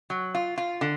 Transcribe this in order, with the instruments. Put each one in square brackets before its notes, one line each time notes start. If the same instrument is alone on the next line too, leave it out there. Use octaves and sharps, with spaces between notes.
[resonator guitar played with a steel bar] F#3
F4
F4
D3